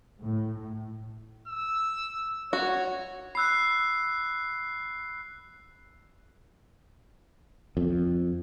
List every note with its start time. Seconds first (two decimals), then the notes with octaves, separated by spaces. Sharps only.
0.21 A2
1.48 E6
2.53 F#4 C#5
3.35 B5 E6 F#6 C7
7.77 F2